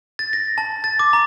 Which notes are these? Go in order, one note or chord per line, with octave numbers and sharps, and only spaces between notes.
A6
A#6
A5
A6
D6
A#5